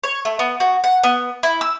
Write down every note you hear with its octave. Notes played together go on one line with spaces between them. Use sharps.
C#5
A3
B3
F#4
F#5
B3
E4
E6